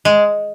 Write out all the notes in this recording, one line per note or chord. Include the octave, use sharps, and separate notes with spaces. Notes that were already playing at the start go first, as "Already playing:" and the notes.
G#3